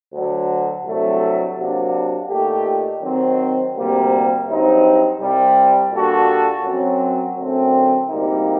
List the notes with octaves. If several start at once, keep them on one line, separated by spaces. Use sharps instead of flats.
D2 D3 F#3
C2 C3 F#3 A3 D4
C3 F#3 A#3 D4 F#4
A#2 A3 D#4 G4
D#3 F#3 C4
D2 C3 G3 A#3
G2 F#3 C4 D#4
C2 C3 G3
A#2 G3 D4 F#4 A4
F#2 F#3 C4
F#2 D3 A3 C4
D2 C3 G3 A#3 D#4